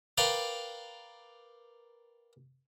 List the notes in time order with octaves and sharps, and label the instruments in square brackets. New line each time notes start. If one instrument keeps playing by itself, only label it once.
[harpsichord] A#4 B4 D5 F5 G5